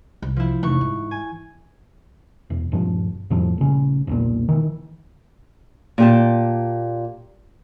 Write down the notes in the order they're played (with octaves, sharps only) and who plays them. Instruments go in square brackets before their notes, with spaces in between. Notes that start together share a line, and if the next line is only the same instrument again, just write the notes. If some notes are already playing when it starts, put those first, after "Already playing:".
[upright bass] C2
[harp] F3 E4
[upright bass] F1 [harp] E3 C#6
[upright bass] G#2
[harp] G#5
[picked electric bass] E1
D#1 G2 F3
F2 A2 F3
A#1 C#3
E1 B1 A#2
D#3 E3
[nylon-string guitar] A#2 G4 A5